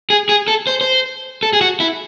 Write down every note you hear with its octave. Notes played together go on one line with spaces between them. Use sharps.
G#4
G#4
A4
C5
C5
A4
G#4
F#4
E4